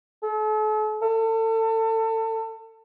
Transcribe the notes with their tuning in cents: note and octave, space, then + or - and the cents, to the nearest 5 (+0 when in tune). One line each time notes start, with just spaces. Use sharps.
A4 -40
A4 +30